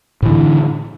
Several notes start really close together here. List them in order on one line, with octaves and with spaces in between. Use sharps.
A2 E3 D3